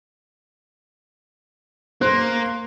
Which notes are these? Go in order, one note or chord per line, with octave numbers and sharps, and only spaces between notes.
A#3 C5 C6 F#6